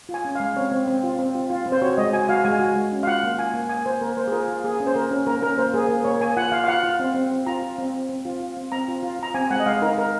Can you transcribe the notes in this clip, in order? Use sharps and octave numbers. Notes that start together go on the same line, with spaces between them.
F4
G#5
C#4
G#3 F5
C4 C#5
C4
C4
F4
C4
F4
F4
C4
C5
F#4 C#5
G#3 D#5
F#4 G#5
F#4 F5
G#3 G#5
F#4
G#3
C#4
F5
F4 F#5
A#3
F4 G#5
A#3
A#3 G#5
A#3 C5
A#3 A#4
A#3 C5
G#4
F4 A#4
F4
A#3 G#4
C#4
C5
A#3 A#4
C#4
A#3 A#4
C#4 A#4
A#3 C5
A#3 G#4
A#3
A#3 C#5
A#3 G#5
F4 F#5
F4 F5
F5
F4 F#5
F4
C4
C4
C4
F4 A#5
F4
C4
C4
C4
F4
F4
C4
C4 A#5
F4
F4
F4 A#5
C4 G#5
G#3 F#5
D#5
G#3 F5
D#4 A#4
D#4 A#4